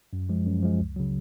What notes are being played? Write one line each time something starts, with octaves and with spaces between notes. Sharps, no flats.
F#2
F3 G#3
F#2
F3 G#3
C#2
C#3 F#3